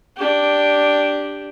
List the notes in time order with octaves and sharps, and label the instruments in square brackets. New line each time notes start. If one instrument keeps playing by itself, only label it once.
[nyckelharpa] D4 G4